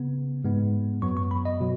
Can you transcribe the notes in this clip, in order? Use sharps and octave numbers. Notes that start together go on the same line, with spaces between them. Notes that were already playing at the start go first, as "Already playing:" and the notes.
Already playing: C#3 B3
G#2 G#3 B3
F#2 F#3 B3 C#6
C#6
B5
D#5
B2 F#3